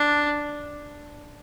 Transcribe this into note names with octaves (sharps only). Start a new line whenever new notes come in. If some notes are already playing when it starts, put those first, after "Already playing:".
Already playing: D4